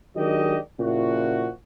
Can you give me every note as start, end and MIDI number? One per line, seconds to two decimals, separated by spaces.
0.15 0.57 51
0.15 0.57 54
0.15 0.57 56
0.15 0.57 62
0.15 0.57 67
0.15 0.57 75
0.79 1.49 46
0.79 1.49 49
0.79 1.49 53
0.79 1.49 64
0.79 1.49 66